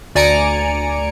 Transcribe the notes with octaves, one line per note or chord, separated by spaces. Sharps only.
D2 D5 G#5 A#5 C#7 D7